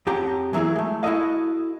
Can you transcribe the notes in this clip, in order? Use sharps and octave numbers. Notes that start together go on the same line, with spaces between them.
F2 C#4 G4 F#5 A#5
E3 F#3 A#3 E4 G#4
G#3 A3
E4 F#4 G4 A4 D#5 F5